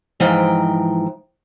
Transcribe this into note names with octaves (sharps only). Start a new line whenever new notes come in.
G#2 E3 F3 G5 A#5